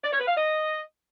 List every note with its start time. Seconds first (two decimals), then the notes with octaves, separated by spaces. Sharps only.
0.03 D5
0.12 C#5
0.20 B4
0.28 F5
0.36 D#5